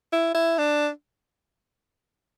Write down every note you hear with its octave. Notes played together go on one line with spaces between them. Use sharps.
E4
E4
D4